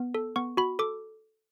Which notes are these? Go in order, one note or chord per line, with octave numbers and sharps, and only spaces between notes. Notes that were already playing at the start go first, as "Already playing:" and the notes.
Already playing: B3
A4
B3 C#6
F#4 B5
A4 D6